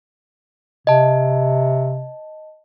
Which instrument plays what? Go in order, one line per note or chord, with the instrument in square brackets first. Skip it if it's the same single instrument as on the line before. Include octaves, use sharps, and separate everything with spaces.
[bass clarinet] C3 [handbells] D#5 A5